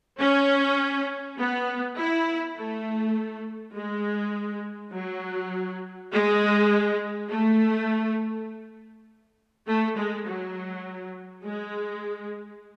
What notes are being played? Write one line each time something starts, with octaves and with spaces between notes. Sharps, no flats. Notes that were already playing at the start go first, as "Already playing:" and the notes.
C#4
B3
E4
A3
G#3
F#3
G#3
A3
A3
G#3
F#3
G#3